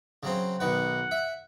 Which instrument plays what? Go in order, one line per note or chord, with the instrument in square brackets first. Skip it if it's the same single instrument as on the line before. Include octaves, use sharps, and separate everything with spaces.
[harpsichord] C#3 F#3 C4
[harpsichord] B1 D#3 B4 [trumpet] F#5
[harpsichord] E5